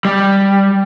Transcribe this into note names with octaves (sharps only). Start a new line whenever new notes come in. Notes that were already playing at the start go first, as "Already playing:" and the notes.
G3